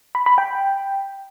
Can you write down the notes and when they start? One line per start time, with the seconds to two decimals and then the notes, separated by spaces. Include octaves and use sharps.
0.15 B5
0.26 B5
0.38 G5